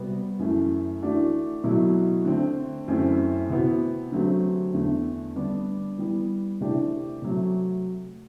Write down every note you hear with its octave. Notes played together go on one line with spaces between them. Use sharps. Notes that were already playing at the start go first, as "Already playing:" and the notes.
Already playing: C3 G3 B3 F#4
F#2 E3 A3
E3 A3 D4 F#4
B2 F#3 A3 E4
D3 A3 C4
F#2 E3 A3 C4 E4
C3 E3 B3 F#4
D3 F#3 A3 C4 G4
E2 D3 A3
D3 G3 B3 D4
E3 G3 B3
C3 E3 A3 D4 G4
C3 F#3 A3